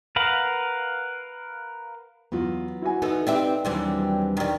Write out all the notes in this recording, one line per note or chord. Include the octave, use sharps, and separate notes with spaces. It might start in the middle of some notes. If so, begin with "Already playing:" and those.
A#4 B4 F5 F#5
E2 F#3 B3 F4
E4 F#4 G#5
E2 B3 D#4 A4
C4 G4 B4 D5 E5
D#2 E3 F#3 G3 C4 D4
D#3 G3